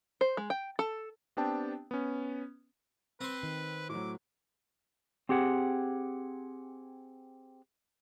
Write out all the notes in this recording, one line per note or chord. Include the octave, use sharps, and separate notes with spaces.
C5
G#3
G5
A4
B3 C4 D4 G4 G5 A5
B3 C#4
C4 B4 C6
D#3
A2 F#3 D6
C4 G4 G#4 F#5